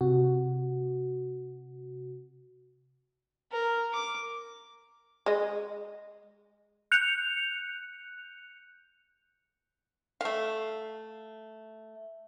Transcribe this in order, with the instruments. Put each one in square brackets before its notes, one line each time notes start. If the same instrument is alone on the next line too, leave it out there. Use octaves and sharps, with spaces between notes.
[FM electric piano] C3 F#4
[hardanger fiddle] A#4
D6
[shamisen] G#3 D#5
[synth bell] F#6 G6 C#7 F7
[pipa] A3 F5